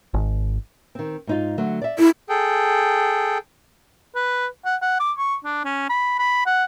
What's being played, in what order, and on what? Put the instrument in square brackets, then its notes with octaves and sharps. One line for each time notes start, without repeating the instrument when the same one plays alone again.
[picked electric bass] G#1
[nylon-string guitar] D#3 C4
G#2 D#4 F4
D3 F#3 A3
D5 E5
[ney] E4 [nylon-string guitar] A4
[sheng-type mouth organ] G#4 A4 G5
[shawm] B4
F#5
F#5
D6
C#6
D4
C#4
B5
B5
F#5